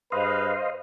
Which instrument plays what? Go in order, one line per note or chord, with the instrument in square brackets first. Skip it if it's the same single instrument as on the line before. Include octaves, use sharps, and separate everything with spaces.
[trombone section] G2 G#4 B4 [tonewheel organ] C5 D#5 F5